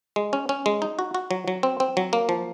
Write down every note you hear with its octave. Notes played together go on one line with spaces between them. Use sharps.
G#3
C#4
C#4
G#3
D#4
F#4
F#4
F#3
F#3
C4
C4
F#3
A#3
F3